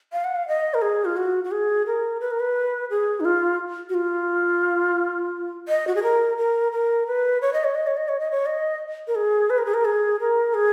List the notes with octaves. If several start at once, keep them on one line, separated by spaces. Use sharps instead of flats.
F5
F#5
F5
D#5
A#4
G#4
F4
F#4
F#4
G#4
A#4
B4
A#4
B4
G#4
D#4
F4
F#4
F4
D#5
F#4
G#4
A#4
A#4
A#4
B4
C#5
D#5
C#5
D#5
C#5
D#5
C#5
D#5
C#5
D#5
A#4
G#4
B4
A#4
G#4
A#4
G#4
A#4
G#4